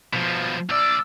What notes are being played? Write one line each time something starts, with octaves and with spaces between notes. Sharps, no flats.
B2 F3
C2 D5 E6 F6